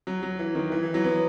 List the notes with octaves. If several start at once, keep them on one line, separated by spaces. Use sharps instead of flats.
F#3
F#3
E3
D#3
E3
E3
F#3
B3